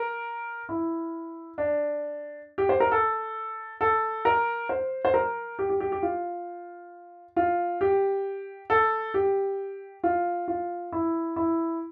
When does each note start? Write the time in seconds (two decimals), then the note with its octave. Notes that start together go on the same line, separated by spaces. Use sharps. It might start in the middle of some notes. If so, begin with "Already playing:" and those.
Already playing: A#4
0.69 E4
1.58 D4
2.58 G4
2.69 C5
2.80 A#4
2.92 A4
3.81 A4
4.25 A#4
4.69 C5
5.05 C5
5.14 A#4
5.59 G4
5.70 G4
5.80 G4
5.92 G4
6.03 F4
7.36 F4
7.81 G4
8.70 A4
9.14 G4
10.04 F4
10.48 F4
10.92 E4
11.36 E4